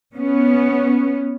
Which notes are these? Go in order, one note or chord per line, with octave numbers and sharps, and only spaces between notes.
B3 C#4